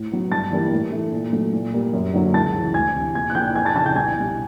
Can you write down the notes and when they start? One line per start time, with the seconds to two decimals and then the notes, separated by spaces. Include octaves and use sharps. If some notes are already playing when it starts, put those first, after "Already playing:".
Already playing: A2
0.12 F#3 B3
0.32 G2 A5 A6
0.52 E3 G3 A#3
0.72 A2
0.92 E3 A3
1.12 A#2
1.33 F#3 A3
1.53 A#2
1.74 G3 A#3
1.93 F#2
2.14 D3 F#3 A#3
2.34 C#2 A5 A6
2.54 C#3 E3
2.74 D2 G#5 G#6
2.95 C3 E3
3.15 A#2 G#5 G#6
3.30 F#6
3.35 F3 A#3 G5 G6
3.55 F2 G#5 G#6
3.65 A5 A6
3.75 C#3 F3 A5 A6
3.86 G5 G6
3.96 C2 G#5 G#6
4.16 B2 G3